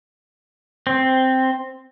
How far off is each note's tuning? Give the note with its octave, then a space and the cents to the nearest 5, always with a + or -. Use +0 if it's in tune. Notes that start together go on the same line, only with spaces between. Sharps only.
C4 +0